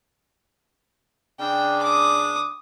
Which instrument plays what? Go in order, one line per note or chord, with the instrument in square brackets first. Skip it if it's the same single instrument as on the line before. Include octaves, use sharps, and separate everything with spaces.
[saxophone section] C#3 D4 [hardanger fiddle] G5
[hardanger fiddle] D6 D#6